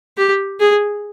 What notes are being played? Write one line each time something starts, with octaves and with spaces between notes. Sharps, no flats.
G4
G#4